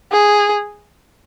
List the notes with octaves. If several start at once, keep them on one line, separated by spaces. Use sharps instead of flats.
G#4